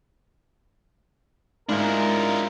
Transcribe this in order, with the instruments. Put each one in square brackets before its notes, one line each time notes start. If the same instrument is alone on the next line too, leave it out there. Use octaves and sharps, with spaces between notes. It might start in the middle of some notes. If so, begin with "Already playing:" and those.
[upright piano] G#2 [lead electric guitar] D4 E4 [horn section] F4 A#4